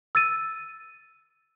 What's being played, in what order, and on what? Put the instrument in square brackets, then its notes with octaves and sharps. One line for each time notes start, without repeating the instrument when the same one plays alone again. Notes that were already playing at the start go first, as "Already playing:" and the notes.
[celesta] E6 A6 D#7